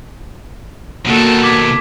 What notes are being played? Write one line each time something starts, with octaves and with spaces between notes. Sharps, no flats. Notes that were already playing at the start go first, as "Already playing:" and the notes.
B2 D#3 A#3 F#4 A4
D6 G#6 B6